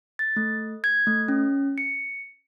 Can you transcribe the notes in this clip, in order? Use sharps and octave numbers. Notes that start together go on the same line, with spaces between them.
A6
A3
G#6
A3
C#4
C#7